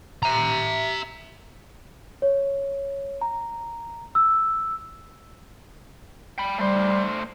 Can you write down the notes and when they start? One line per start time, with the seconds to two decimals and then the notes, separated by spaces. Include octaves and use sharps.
0.23 E5 A#5
2.22 C#5
3.21 A#5
4.15 E6
6.38 G5 B5
6.58 G3 A3 C5